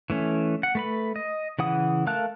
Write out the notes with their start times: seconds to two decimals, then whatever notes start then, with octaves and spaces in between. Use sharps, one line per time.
0.10 E3 A3 C#4
0.63 F#5
0.75 A3 B4 B5
1.16 D#5
1.59 C#3 E3 F#5 D#6
2.07 A3 A#4 F5 A5 F#6